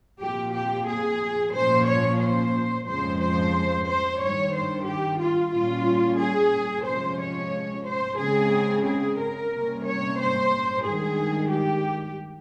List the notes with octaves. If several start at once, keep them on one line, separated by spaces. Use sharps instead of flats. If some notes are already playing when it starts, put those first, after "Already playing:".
A#2 F3 C4 G4
G4
G#4
A#2 F3 A#3 C#4 C5
C#5
C5
F2 C#3 F3 G#3 C5
C5
C5
G2 D#3 G3 C#5
C5
G4
F4
A#2 G3 C#4 F4
G#4
C3 F3 G#3 C#4 C5
C#5
C5
C#3 G#3 C4 G#4
G#4
A#4
C3 G3 A#3 C#4
C#5
C5
G2 D#3 G#3 G#4
G4